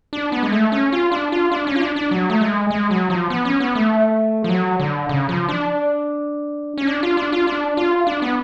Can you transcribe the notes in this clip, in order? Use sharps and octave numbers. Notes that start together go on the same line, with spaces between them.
D4
B3
G#3
A3
C#4
F4
D4
F4
D4
C#4
F4
D4
D4
F#3
A3
G#3
G#3
F#3
F3
B3
C#4
B3
A3
F3
F#3
D3
C#3
F3
D4
C#4
D4
F4
D4
F4
D4
F4
D4
B3